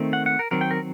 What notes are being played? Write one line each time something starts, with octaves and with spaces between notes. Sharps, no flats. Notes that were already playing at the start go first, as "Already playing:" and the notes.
Already playing: D#3 A3 C4
F#5
F#5
A#4
D#3 F#3 C4 A#4
G5
A#4